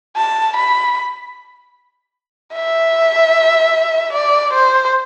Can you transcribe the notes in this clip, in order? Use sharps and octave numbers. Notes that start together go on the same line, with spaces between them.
A5
B5
E5
D5
C5